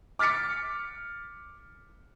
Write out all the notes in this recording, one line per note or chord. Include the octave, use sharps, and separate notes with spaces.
D6 F6 A6 B6 C#7